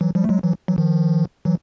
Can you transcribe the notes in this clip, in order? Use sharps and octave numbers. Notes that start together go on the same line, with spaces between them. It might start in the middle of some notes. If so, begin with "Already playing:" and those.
E3 F#3
F3 G3
A3
F#3 G#3
E3 F#3
E3 F#3
D#3 F3
E3 F#3